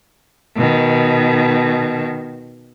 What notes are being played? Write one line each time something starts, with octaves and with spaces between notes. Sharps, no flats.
B2 D#3